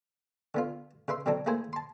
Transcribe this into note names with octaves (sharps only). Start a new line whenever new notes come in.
D3 B3 F4
C#3 B4 E5 C6
B2 D3 F#3 C4 D4 D#4
A3 A#3 E4 G#4 C5 G#5
A5 C6